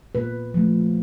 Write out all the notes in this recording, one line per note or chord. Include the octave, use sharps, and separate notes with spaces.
A#2 B4
F3 A3